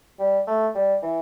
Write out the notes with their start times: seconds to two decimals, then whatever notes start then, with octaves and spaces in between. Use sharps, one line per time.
0.19 G3
0.47 A3
0.75 G3
1.03 E3